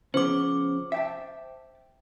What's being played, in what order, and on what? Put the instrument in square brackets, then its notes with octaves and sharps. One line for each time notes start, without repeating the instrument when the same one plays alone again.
[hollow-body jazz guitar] C#3 F3 B3 [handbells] C5 D6
[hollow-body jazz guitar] E5 G5 A5